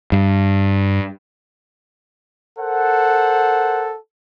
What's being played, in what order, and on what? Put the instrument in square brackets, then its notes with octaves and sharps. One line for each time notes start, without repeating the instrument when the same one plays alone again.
[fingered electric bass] G2
[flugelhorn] A4 [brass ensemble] A#4 C5 F#5